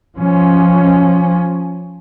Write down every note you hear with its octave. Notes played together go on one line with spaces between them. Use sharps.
F3 C#4